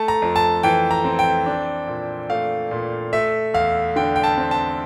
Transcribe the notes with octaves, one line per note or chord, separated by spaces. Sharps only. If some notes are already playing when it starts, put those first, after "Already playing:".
Already playing: A3 A5
A#5
F2
A5
E3 G5
A#5
C4
G5
D4
A#2
A3 F5
A#2
A3 E5
E2 F5
D3 G5
G5
A5
C4
A5